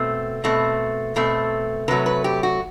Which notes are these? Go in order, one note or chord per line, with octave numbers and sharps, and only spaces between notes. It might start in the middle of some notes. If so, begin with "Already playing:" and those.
Already playing: B2 A3 C4
B2 A3 C4
B2 A3 C4
C3 F#3 A3 B4
B4
G4
F#4